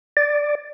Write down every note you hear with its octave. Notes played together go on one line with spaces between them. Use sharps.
D5